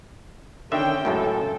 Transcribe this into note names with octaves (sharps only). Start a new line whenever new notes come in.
D3 D#3 C#4 E5 G5
C#2 F#2 A2 A4